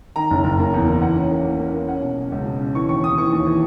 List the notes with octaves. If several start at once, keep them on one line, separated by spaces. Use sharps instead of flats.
D#3 A#5
F#1
F#1
A#3
E2
A#3
E3 F#5
C#4
A#3
A#3
A#3
A#3
C#4 F#5
B2
F#3
C#2
B2
C#4
E3 C#6
D#2 C#6
D#2 D#6
E3 C#6
D#2
E3